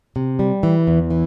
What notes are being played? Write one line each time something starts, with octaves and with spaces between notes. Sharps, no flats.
C3
G3
E3
E2
E3